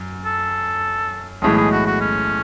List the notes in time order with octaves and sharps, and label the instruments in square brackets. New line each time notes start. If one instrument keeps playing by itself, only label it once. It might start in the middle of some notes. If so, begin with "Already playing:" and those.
Already playing: [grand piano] F#2
[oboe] A4
[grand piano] B1 A2 E3 G#3 [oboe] G#4
[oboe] G#4
F#4
F#4
C#4